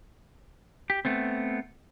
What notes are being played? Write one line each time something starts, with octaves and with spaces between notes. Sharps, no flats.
G4
A3 B3 C4